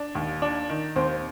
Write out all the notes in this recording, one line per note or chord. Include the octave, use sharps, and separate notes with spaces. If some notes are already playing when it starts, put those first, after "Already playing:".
Already playing: D4
D#2
D4
D#3
D#2 C4 C5